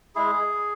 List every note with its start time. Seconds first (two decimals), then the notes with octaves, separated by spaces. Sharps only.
0.15 G#3 E4 G#4